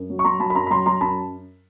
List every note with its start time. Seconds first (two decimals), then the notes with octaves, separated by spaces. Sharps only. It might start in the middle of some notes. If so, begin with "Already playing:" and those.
Already playing: F#2
0.10 F#3
0.19 C#6
0.24 F#3 A#5 C6
0.40 F#3 A5 B5
0.50 B5
0.55 F#2 A#5 C6
0.67 B5
0.70 F#3 A#5 C6
0.86 F#3 A#5 C6
1.01 F#2 A5 B5